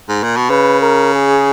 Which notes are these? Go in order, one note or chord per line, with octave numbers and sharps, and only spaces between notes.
G#2
A#2
B2
C#3 B4
A#4
G#4